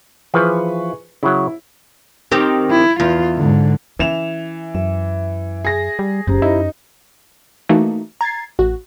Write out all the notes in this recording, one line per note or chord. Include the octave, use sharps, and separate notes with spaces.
E3 F3 G#4 B4 C#6
C#3 F#3 E4
D#3 C4 G4
E4
E2 F4
G#2 D3
E3 C#4 E7 F7
F#2 E5
G#4 A#6
G3
F#1 F#2 G4 C5 A#5
D#4 E4
E3 A3 A#3 D#4 F#4
A#5 G#6 A6 C7
A1 F#4